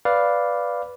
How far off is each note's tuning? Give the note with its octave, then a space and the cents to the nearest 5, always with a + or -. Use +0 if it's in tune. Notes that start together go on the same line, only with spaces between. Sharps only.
B4 +0 D5 -5 F5 +0